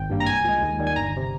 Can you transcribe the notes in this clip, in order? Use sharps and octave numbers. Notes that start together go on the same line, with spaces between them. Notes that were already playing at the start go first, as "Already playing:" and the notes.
Already playing: G#1 G5
G2 G3 A#3
A#5
C2 G#5
A#2 G#3
D#2
D#3 G3
G#5
G1 A#5
C3